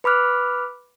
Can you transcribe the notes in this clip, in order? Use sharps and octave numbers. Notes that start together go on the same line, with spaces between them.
B4 B5 D6 F6 F#6